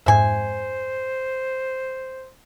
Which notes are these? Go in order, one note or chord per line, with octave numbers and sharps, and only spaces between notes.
F2 G#2 C5 E5 G#5